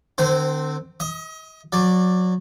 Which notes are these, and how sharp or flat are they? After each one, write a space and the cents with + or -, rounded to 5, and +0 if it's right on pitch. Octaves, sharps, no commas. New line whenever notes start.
D3 +45 C4 +0 C5 -20
D#5 +40 D#6 +0
F#3 -20 D5 +0